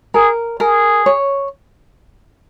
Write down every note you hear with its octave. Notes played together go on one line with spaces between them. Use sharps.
G#4 A#4
G#4 A#4
C#5